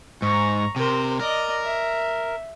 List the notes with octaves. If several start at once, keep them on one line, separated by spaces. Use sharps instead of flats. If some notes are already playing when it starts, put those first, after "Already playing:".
G#2 A#5 C#6
C3 A#4 C5
A#4 D5 D#5
E5